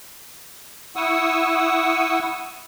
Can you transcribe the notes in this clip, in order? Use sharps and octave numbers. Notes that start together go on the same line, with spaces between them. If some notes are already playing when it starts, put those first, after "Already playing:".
E4 F#5 C#6 D#6 E6